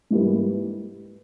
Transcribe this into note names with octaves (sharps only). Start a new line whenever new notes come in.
G#2 E3 G3 A#3